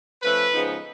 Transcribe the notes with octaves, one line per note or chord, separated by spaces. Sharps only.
F3 A3 C#4 B4
C#3 F3 G#3 B3 D#4